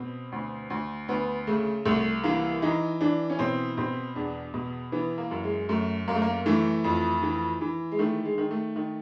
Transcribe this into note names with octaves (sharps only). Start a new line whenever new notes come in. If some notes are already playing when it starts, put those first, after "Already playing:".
Already playing: B2 C4
D2
D2
D2 B3
C#3 A3
C2 A3
E3 A#3
E3 D#4
E3 D4
C#4
B2 C4
B2 C4
E2 D4
B2
E3 B3
A#3
F#2
G#3
F#2 A3
F#2 A#3
A3
A#3
E3 A3
F2
E3
E3
G#3
D#3 A3
G#3
D#3
A3
D#3